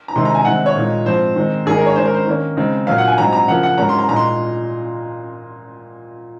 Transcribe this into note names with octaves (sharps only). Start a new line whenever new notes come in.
A#5
C3 D#3 G#3 D#4 C6
A#5
G#5
C3 D#3 G#3 C4 F#5
C#5
A#2 G#3 D#4
G#2 F3 C4 C5
D#3 G#3 C4 D#4
G#2 D#3 A#3 D#4 G#4
A#4
C#5
D#3 G#3 C#4 C5
A#4
C5
D#3 A#3 C#4
C#3 G#3 C4 D#4
A#2 F#3 A#3 F5
F#5
G#5
G#2 F#3 C4 D#4 A#5
A#5
C#3 F3 A#3 F#5
F#5
G#2 F#3 A#3 C#4 A#5
C6
A#5
A#2 G#3 D#4 A#5
C6